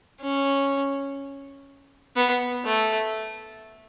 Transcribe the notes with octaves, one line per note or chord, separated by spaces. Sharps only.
C#4
B3
A3